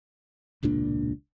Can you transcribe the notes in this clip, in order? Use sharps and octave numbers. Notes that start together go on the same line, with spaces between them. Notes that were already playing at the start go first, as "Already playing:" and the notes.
E1 C#2 A#2 D4